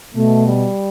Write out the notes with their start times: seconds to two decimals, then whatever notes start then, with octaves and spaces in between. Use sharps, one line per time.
0.15 B2 A3
0.47 G3